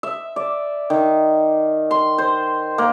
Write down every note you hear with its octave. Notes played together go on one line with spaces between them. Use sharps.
E5
D5
D#3
C6
C5
A#3